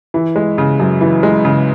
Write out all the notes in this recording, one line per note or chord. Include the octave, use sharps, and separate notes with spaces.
E3
G#3
C#3
F#2
E3
G#3
C#3